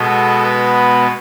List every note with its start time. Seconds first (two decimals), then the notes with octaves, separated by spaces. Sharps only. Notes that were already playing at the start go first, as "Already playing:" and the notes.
Already playing: B2 G#3 B3 A4
0.43 B4